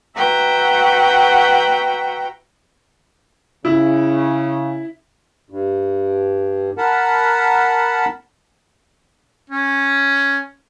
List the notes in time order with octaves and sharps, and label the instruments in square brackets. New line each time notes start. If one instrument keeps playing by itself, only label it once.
[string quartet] F#4 B4 E5 F#5 G5 A#5
[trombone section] C#3 [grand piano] E4
[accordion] G2
A#4 F#5 A5 B5
[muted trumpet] C#4